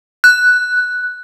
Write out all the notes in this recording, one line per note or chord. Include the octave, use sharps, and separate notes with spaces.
F#6